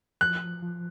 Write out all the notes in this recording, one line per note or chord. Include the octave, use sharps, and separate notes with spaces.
F3 F#6
F3
F3